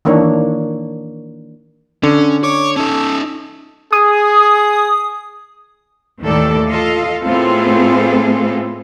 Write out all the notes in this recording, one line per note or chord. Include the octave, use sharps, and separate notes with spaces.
D#3 E3 A#3 D4 C#5
D3 C#4
C#5 C#6 D6
C#4 D#4 A4
G#4 D#6
D#2 A2 D#3 E3 A4 D5
F4 A4 D#5 F5
A2 B3 C4 F4 G#4 A4